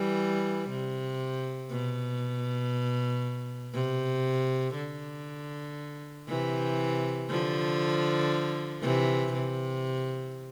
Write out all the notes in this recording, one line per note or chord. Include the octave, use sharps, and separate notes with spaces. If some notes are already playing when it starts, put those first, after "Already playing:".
Already playing: E3 G3
C3
B2
C3
D3
C3 E3
D3 F3
C3 E3
C3